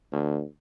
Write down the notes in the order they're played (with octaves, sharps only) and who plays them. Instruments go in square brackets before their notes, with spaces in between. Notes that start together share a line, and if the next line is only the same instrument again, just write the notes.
[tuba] D2